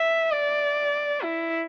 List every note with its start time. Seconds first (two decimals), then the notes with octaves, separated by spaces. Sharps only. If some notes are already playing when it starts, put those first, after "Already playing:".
Already playing: E5
0.32 D5
1.23 E4